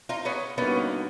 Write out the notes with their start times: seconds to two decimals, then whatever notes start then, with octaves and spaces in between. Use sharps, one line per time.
0.09 D#4 F4
0.25 B3 C#4
0.57 D3 G3 A#3 B3 C#4 D#4 F#4